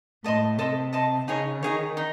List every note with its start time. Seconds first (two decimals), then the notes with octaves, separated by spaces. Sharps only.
0.24 A2 A4 D#5 A5 C6
0.58 C3 A4 D#5 A5 C6
0.93 A4 D#5 A5 C6
1.27 C#3 D#4 G#4 C#5
1.62 D#3 D#4 G#4 C#5
1.97 D#4